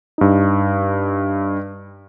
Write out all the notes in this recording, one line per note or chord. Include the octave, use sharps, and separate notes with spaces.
G2 D#4